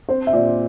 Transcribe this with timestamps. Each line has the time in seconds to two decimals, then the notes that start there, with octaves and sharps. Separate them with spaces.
0.09 C4 C5
0.27 E5
0.33 A#2 D5